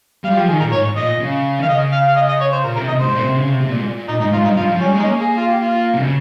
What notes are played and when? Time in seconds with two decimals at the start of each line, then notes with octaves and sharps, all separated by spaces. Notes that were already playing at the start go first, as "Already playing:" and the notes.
0.24 G3 F5
0.30 F4
0.36 F3 G4
0.48 D#3 G#4
0.60 A#2 A#4
0.72 G#2 C#5
0.96 A#2 D#5
1.20 C#3
1.60 D#3 F5
1.69 C#3 D#5
1.92 F5
2.07 F5
2.16 D#5
2.29 D#5
2.41 C#5
2.52 C5
2.64 A#2 A#4
2.76 C3 A#4
2.88 C3 D#5
3.00 G#2 C5
3.12 A#2
3.24 C3
3.36 C#3
3.49 C3
3.61 C3
3.69 A#2
3.76 G#2
3.85 A#2
4.08 A#2 D#4
4.20 G#2 D#4
4.32 G#2 F4
4.44 G2 D#4
4.56 G2 F4
4.68 F3
4.80 G3 C#4
4.92 G#3
4.99 D#4
5.04 A#3 C#4
5.21 G#4
5.37 F4
5.48 G4
5.60 F4
5.94 C3
6.01 C#3